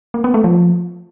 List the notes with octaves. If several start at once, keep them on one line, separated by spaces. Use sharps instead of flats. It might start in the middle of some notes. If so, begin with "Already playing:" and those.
A#3
B3
A3
F3